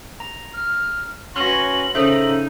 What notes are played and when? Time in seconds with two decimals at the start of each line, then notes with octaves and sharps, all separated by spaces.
0.20 A#5
0.54 F6
1.36 C#4 F#4 B4 C6 C#6 A#6 F#7
1.95 C#3 D#4 A4 C5 E5